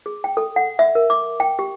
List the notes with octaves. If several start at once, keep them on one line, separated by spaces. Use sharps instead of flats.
G#4
G5
A4
F#5
E5
A#4
D6
G5
G4